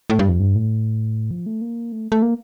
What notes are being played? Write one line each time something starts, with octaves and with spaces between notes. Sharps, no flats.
A2
G2
F2
G2
A2
F3
A3
A#3
A3
A3
A#3